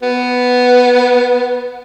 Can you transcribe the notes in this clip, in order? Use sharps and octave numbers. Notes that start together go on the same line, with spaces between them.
B3